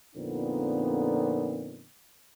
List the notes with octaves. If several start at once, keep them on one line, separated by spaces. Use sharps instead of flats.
F2 A#2 D3 B3 C4 D#4